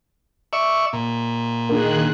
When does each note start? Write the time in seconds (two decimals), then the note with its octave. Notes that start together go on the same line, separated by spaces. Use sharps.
0.53 D5 E5 C#6
0.93 A#2
1.69 D#3 A#3 D4 G#4 F#6